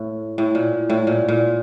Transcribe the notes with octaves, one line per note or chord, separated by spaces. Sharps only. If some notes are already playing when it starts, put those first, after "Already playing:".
Already playing: A2
A2
A#2
A2
A#2
A#2